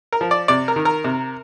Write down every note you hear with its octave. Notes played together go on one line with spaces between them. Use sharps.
A#4
F3
D5
C3 D5
A#4
D#3
A#4
C3